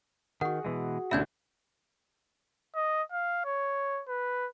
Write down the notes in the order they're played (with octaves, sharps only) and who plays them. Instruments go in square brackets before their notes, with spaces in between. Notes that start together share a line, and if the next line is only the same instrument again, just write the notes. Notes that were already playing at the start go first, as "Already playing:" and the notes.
[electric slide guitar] D#3 [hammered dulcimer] F#4 G#4 [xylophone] F#5
[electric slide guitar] B2 E3 G#3
[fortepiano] A1 D2 [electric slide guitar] B2 E4 [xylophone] E5 G6 G#6
[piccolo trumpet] D#5
F5
C#5
B4